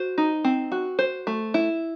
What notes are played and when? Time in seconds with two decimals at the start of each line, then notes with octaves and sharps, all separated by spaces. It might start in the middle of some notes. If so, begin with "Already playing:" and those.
Already playing: F#4 C5
0.18 D#4
0.44 C4
0.72 F#4
0.99 C5
1.27 A3
1.54 E4